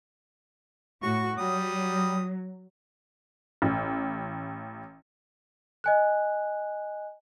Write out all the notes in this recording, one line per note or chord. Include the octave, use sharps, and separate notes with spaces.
A2 F#4 C#6
F#3 G3 D#6
A1
D#5 G#5 F#6